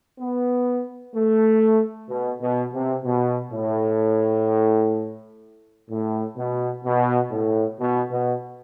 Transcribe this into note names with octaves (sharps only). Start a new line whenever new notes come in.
B3
A3
B2
B2
C3
B2
A2
A2
B2
B2
A2
B2
B2